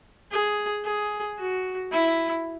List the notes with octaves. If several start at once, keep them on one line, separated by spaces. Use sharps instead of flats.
G#4
G#4
F#4
E4